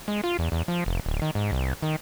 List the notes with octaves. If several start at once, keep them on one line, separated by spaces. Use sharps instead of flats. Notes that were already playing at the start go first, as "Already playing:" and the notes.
G#3
F4
E2
E2
F3
F1
D1
D#3
G#2
C2
D#3